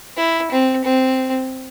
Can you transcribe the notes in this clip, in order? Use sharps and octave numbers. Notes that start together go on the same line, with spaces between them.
E4
C4
C4